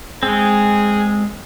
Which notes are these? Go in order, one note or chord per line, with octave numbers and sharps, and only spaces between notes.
G#3 C4 G#4